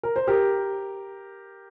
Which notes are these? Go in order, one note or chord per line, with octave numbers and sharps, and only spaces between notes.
A#4
C5
G4 A#4